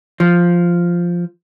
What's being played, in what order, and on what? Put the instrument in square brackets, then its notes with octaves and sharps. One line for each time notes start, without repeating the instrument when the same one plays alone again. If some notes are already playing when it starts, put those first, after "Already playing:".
[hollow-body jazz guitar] F3